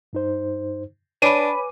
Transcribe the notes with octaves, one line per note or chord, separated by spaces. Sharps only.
G2 D#4 C5
D4 B4 C#5 G#5 B5 D6 D#7